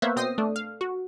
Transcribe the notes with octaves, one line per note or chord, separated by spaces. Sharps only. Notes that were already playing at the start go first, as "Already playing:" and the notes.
A#3 B3 C5 C#5 E5 F#5
B2 C4 G5 D#6 A#6 C7
A3 D4
F5
F#4